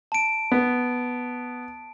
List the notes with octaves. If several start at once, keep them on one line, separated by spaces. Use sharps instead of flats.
A5 D7
B3